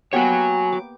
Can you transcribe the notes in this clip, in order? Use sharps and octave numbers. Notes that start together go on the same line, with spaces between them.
A#3 B3 F#4 G4 C#5 G#5
D6